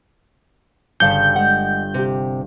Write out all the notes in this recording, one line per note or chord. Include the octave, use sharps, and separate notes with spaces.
G1 C#3 G3 F5 A5 G6 C#7
G#3 F#5
C3 G4